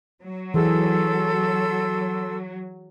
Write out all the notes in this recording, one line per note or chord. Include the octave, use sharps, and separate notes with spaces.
F#3
E3 G#4 A4 C6 E6